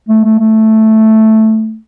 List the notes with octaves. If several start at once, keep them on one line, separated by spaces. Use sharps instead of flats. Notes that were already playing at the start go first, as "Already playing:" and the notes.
A3
A3
A3